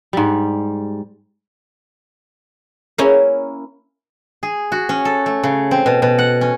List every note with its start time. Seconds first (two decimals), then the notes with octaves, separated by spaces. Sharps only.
0.13 G#2 G3
2.98 A#3 C#4 E4 A#4
4.43 G#4
4.72 F#4
4.89 C#4
5.05 A4
5.26 A3
5.43 C#3
5.71 C4
5.86 B2
6.02 B2
6.18 F#5
6.41 C#4